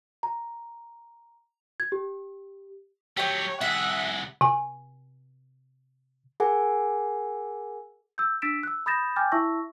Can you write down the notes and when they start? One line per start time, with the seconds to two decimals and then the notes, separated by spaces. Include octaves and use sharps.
0.23 A#5
1.80 G#6
1.92 G4
3.17 F#3 A3 G4 C#5 G5
3.61 C2 G#4 E5 F#5
4.41 C3 G#5
6.40 G#4 A#4 F#5 G#5
8.18 E6 G6
8.42 D4 E6 A6 B6 D7 E7
8.63 E6 F#6
8.86 B5 D#6 G6 A6 A#6 E7
9.16 G5 G#5 D6 F6 G6 A6
9.32 E4 E5 A5 C#6 E6 A#6